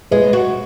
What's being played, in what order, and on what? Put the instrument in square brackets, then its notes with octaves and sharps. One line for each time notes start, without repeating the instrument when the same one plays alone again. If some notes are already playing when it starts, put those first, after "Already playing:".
[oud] G#3 [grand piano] B4
[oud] F#4